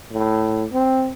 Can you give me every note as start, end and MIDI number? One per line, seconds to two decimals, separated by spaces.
0.12 0.65 45
0.73 1.12 60